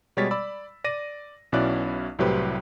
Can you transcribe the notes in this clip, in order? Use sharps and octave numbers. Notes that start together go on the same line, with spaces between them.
B2 G3 G#3 C#5 A6 B6
D5 B5 E6
D5 A#6 D#7
B1 B2 C#4 E4 D5 F#6
C2 A2 F#3 G4 B4 C5